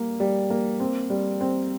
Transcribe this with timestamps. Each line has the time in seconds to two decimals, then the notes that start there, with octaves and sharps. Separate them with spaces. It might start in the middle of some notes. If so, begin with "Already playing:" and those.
Already playing: G3 A#3
0.20 G3
0.50 A#3
0.80 C4
1.10 G3
1.41 C4